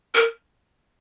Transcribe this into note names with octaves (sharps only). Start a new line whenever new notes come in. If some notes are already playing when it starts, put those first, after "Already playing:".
A#4